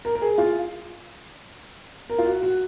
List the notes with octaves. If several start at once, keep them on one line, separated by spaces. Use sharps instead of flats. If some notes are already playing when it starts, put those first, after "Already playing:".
A#4
A#4
G#4
F4
A#4
F4
F#4
F#4